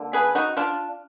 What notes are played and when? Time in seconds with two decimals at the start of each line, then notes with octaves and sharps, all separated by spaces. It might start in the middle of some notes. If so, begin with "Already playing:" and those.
Already playing: D3 A#3
0.13 G#4 B4
0.35 D#4 F#4
0.57 D4 F4